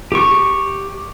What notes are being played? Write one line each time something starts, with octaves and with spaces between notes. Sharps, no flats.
G4 C#6